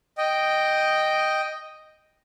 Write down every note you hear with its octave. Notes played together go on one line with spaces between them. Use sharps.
D#5 G5